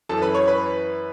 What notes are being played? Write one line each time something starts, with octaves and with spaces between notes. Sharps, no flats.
F#2 E3 A4 A5
B4 B5
C#5 C#6
B4 B5